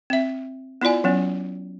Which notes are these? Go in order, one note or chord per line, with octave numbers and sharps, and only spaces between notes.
C4 E5
B3 E4 F4 D5 G#5
F#3 B3 C#4